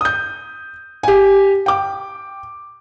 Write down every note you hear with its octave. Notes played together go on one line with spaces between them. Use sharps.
D#6 G6
G4 G#5
G5 D6